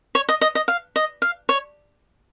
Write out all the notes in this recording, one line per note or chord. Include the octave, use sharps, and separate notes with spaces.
C#5
D#5
D#5
D#5
F5
D#5
F5
C#5